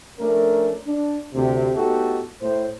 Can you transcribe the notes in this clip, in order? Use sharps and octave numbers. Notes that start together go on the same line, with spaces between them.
F3 A3 C#4 D4 A#4
D4
D2 C3
A2 B3 D#4 F#4 G4 A4
A2 C5